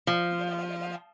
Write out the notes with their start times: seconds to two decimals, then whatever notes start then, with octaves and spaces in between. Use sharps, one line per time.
0.07 F3